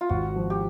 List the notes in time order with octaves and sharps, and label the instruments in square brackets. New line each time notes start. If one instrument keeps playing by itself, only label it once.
[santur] F4
[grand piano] G#1 [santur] F#4
[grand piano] F3
[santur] G4